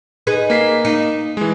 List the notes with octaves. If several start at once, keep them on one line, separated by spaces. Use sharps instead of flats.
D#4 G#4 B4
A#3 B6 C7
D#4
E3 G#3